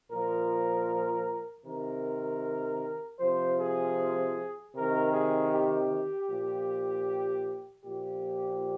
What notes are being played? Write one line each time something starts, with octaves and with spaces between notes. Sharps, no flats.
A#2 F3 A#4
C3 D#3 A#4
C3 F3 C5
G#4
C3 D#3 A#4
G#4
G4
A#2 F3
A#2 F3 G4